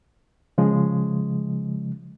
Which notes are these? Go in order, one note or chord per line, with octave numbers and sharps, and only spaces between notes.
C#3 F3 G#3